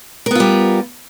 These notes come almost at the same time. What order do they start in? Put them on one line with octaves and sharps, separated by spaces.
A#4 B3 F4 G3